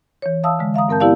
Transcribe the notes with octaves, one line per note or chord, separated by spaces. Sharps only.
E3 C#5
E5 F5 A5 D#6 E6
D3 G#3
E5 F5 A#5 D#6
G2 C4 A#4 A5 G6
B3 E4 G4 D5 F5 A5